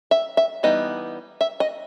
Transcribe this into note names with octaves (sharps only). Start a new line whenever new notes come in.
E5
E5
E3 G3 B3 D#4 D#5
E5
D#5